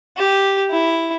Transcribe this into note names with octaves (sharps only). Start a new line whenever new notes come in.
G4
E4